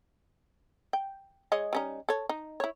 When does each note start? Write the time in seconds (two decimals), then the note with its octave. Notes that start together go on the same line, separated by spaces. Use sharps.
0.93 G5
1.52 G#3 C#5 D#5
1.73 G3 C#4 D#4
2.09 A4 C#5
2.29 D#4
2.60 E4 C#5